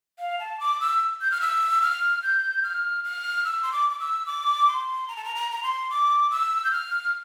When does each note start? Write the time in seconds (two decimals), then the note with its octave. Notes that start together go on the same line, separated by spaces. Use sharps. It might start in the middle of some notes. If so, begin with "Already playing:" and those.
0.19 F5
0.39 A5
0.60 D6
0.80 E6
1.21 G6
1.31 F6
1.41 E6
1.82 F6
2.23 G6
2.63 F6
3.04 F6
3.45 E6
3.63 C6
3.72 D6
3.90 D6
4.00 E6
4.27 D6
4.68 C6
5.08 A#5
5.16 A5
5.24 A#5
5.35 A#5
5.51 A#5
5.63 C6
5.90 D6
6.30 E6
6.65 G6
6.72 F6